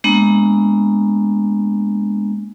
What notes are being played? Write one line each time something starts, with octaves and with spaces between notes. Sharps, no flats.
G#3 A#3 B3 D4